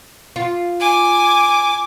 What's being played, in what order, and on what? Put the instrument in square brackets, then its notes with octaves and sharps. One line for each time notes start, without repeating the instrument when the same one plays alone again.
[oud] F4
[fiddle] G#5 D6